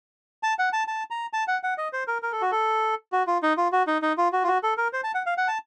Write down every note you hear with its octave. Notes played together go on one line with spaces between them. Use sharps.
A5
F#5
A5
A5
A#5
A5
F#5
F#5
D#5
C5
A#4
A#4
A4
F#4
A4
F#4
F4
D#4
F4
F#4
D#4
D#4
F4
F#4
F4
F#4
A4
A#4
C5
A5
F#5
F5
F#5
A5